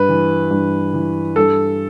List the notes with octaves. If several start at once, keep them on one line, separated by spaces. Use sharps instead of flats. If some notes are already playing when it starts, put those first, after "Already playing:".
Already playing: G2 B4
E3
G2
E3
G2 A4